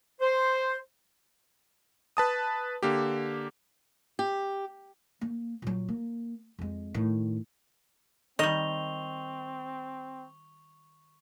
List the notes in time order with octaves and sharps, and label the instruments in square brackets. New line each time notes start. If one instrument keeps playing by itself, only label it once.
[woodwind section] C5
[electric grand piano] B4 A5 D#6
D3 A#3 G4
[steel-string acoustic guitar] G4
[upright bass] A#3
A#2 F#3
A#3
F2 G#3
A2 D#3
[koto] D#3 G3 [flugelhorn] C4 [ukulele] D#5 [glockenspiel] C#6 F7 G7